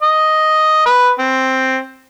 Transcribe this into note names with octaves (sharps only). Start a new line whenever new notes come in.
D#5
B4
C4